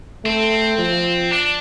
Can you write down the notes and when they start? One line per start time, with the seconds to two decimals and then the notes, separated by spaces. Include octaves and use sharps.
0.25 A3 C4
0.79 F3
1.31 D4